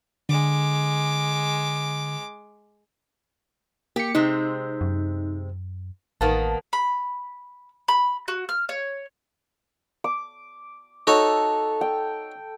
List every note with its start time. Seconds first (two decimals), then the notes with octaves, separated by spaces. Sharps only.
0.29 D3 G#3 D6
3.96 A#3 G4 C#7
4.15 C3 G#3 C4 D#4
4.81 F#2
6.21 A1 D#3 A#3 B3 A5
6.73 B5
7.88 B5
8.28 F#4
8.49 F6
8.69 C#5
10.04 D6
11.07 D#4 F#4 A4 C#5
11.81 G5